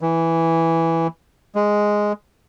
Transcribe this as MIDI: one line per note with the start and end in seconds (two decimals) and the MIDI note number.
0.01 1.07 52
1.55 2.12 56